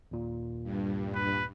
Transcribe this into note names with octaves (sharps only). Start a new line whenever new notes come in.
D#2 A#2
G2
B4